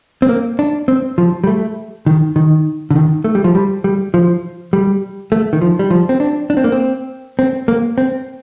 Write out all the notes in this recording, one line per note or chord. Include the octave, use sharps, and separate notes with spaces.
C4
A#3
D4
C4
F3
G3
A3
D#3
D#3
D3
D#3
A3
G3
F3
G3
G3
F3
G3
A3
D#3
F3
G3
F3
C4
D4
D4
C4
A#3
C4
C4
A#3
C4